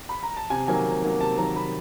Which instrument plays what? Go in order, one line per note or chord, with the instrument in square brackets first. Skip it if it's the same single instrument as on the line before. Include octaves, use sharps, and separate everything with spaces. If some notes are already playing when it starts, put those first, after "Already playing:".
[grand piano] B5
A#5
A5
[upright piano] C3 [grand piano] G#5
[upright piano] D#3 F#3 A#3 [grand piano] G#5
[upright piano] C3
D#3 F#3 A#3
[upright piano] C3 [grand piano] A5
[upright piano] D#3 F#3 A#3 [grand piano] A#5
[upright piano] C3 [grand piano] B5